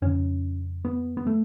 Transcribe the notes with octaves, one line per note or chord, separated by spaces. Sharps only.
F2 C#3 C#4
B3
B3
A3